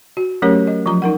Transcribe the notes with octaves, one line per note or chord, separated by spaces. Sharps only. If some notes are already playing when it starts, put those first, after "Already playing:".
F#4
F#3 A3 C#4 G4 A#4 C#5
D#5
F3 F#3 F4 A#5
D#4 A#4 F#5